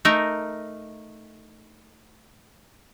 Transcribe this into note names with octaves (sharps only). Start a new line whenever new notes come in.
A3 D#4 A#4